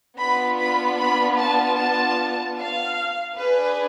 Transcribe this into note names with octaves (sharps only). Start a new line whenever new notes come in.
B3 D4 F4 B5
B5
B5
A5
A5
F5
D4 G#4 B4